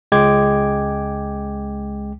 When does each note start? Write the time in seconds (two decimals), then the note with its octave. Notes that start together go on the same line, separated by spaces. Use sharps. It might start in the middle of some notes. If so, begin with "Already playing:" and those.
0.12 C#2 G#3 G5 D6 G#6